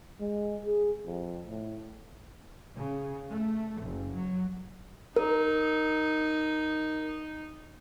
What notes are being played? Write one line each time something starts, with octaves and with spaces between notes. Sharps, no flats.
G#3
G#4
F2
A2
C#3
A3
F#1
F#3
D#4 A#4